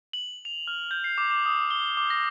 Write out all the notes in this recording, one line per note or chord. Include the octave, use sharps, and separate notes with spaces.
F#7
F7
F6
G6
C7
D6
D6
D#6
G7
D6
A#6